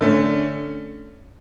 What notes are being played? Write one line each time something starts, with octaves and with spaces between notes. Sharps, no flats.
D3 A3 C#4